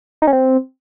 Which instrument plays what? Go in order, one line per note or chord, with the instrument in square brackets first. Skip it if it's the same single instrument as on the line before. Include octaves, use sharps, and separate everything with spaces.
[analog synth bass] D#4
C#4
C4